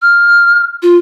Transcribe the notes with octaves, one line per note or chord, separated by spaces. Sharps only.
F6
F4